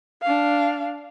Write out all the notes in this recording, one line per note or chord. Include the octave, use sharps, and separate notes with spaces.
D4 F5